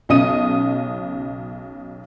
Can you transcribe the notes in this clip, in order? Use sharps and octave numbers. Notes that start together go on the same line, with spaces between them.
B1 C#3 D#5 D#6 D#7